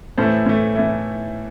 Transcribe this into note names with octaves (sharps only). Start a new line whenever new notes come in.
A2 E3 A3 A4 C5
A2 E3 A3
A2 E3 A3